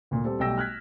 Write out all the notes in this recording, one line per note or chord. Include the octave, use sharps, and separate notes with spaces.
D2 A#2
G3 C4 A4
B1 G3 A3 G5 E6 A#6
F6 F#6 G#6 B6